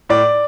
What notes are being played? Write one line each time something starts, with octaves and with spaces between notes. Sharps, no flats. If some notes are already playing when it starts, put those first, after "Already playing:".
A2 D5